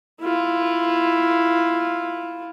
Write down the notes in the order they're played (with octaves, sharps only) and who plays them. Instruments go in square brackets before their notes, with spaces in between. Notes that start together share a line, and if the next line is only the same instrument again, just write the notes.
[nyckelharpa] E4 F4